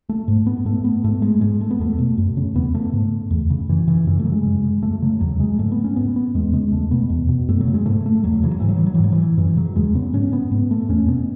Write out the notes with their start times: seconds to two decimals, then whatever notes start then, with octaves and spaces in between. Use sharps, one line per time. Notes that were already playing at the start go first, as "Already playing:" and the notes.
0.09 A3
0.28 G#2
0.47 B3
0.65 G#2 A3
0.84 B3
1.04 G#2 A3
1.22 G#3
1.41 G#2 G#3
1.61 A3
1.71 B3
1.79 E2 A3
1.99 B2
2.18 F#2
2.37 C#3
2.55 E2 B3
2.74 C#3 A3
2.93 G#2
3.31 E2
3.50 C#3
3.69 F#2 E3
3.87 C#3 E3
4.07 F#2 E3
4.20 A3
4.25 C#3 F#3
4.32 G#3
4.45 F#2
4.64 C#3
4.82 F#2 A3
5.02 C#3 F#3
5.21 E2 F#3
5.39 C#3 G#3
5.59 G#2 A3
5.72 B3
5.84 C#4
5.96 G#2 B3
6.16 B3
6.35 E2 G#3
6.53 C#3 G#3
6.72 E2 A3
6.91 B2 B3
7.10 E2
7.29 B2
7.48 F#2 A3
7.60 F#3
7.67 C#3
7.74 G#3
7.86 G#2 A3
8.06 A3
8.24 E2 F#3
8.43 C#3 E3
8.51 F#3
8.60 G#2 E3
8.69 F#3
8.78 E3
8.86 F#3
8.95 E3
9.00 G#2 F#3
9.12 E3
9.38 F#2 E3
9.57 C#3 F#3
9.76 E2 G#3
9.95 C#3 B3
10.13 G#2 C#4
10.33 B3
10.51 G#2 B3
10.71 A3
10.89 E2 C#4
11.08 B2 B3